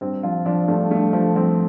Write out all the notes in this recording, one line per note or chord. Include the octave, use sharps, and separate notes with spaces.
G2 C4
F3 F4
F3 D4
G2 A3
G2 A3
F3
F3 C4